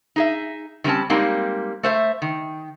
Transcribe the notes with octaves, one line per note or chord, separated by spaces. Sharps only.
D#4 G#4 E5
D#3 G3 C4 C#4 A5
G3 G#3 A#3 C4 D#4
A3 C5 E5
D#3